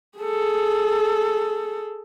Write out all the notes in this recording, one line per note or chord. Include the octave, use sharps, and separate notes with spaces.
G#4 A4